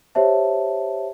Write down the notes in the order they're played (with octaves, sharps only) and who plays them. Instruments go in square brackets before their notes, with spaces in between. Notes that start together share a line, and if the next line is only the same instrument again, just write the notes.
[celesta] G4 C5 C#5 E5 A5